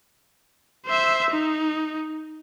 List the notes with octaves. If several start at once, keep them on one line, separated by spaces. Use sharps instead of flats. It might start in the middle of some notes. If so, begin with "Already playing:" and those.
C5 E5
D#4